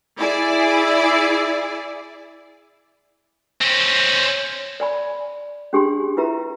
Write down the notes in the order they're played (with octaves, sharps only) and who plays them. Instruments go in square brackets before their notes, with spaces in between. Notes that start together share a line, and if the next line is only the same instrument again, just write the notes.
[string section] E4 G#4 D5
[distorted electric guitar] C4 C#4
[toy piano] D5 G#5 B5
C#4 D4 G4 G#4 G#5 C6
E4 F4 B4 E5 A#5